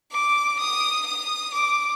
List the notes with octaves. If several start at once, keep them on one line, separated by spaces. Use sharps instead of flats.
D6
D#6
D#6
D6